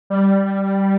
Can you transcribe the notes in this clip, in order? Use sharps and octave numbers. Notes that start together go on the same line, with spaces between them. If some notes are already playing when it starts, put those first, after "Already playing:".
G3